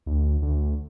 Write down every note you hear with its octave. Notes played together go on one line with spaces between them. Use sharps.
D2
D2